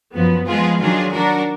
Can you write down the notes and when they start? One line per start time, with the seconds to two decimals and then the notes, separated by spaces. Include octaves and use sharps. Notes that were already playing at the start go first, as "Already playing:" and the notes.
0.14 F#2 F3 B3
0.47 F3 G#3 B3 F4 G#4
0.80 D#3 F#3 D4 F4 G#4
1.13 F#3 D4 F#4 A#4